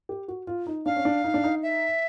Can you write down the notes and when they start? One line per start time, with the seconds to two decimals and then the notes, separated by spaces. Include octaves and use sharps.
0.09 G4
0.28 F#4
0.47 F4
0.67 D#4
0.86 D4 F5
0.96 C#4
1.05 D4
1.24 D#4
1.34 D4
1.44 D#4
1.63 E5